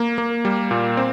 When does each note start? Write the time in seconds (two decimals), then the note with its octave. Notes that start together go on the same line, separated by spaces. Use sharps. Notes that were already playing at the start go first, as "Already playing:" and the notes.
Already playing: A#3
0.18 A#3
0.45 G3
0.71 A#2
0.97 C4